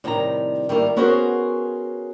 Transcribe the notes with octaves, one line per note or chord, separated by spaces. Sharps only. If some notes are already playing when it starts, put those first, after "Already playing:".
A2 C3 D#3 G3 G#5 A#5
D#3 G3 A3 A#3 A#4
B3 C#4 F#4 G#4 A#4 C5